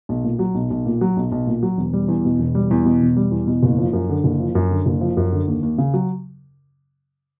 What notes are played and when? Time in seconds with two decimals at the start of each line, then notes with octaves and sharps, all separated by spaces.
0.09 B1
0.24 A#2
0.39 F#3
0.55 B1
0.70 B1
0.86 A#2
1.01 F#3
1.17 B1
1.32 B1
1.47 A#2
1.63 F#3
1.78 E1
1.93 G3
2.08 E2
2.25 B2
2.39 E1
2.55 G3
2.71 E2
2.85 B2
3.01 E1
3.17 G3
3.31 E2
3.47 B2
3.63 F#1
3.78 F3
3.93 F#2
4.09 D3
4.24 F#1
4.40 F3
4.55 F#2
4.71 D3
4.86 F#1
5.01 F3
5.17 F#2
5.32 D3
5.48 D#2
5.63 D#2
5.78 C#3
5.94 F#3